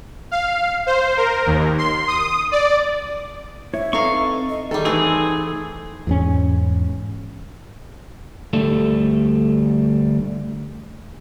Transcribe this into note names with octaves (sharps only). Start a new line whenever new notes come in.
F5
C5
A#4
D#2
C6
D#6
D5
E4 C#5 E5
C4 D#4 A4 B4 F5 C#6
D#5
D#3 G3 G#4 A4
E3 A3 C4 D#4 G#4
E2 G#2 C#4
D2 G3 A3 A4